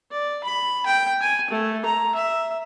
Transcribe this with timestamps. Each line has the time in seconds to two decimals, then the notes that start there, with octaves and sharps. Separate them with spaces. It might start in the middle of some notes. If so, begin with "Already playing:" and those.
0.11 D5
0.44 B5
0.86 G5
1.21 G#5
1.50 A3
1.85 A#5
2.15 E5